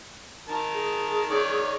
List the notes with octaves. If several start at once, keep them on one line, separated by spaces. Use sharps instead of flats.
D#3 A#4 A5
G#4
D#3 C#5 D5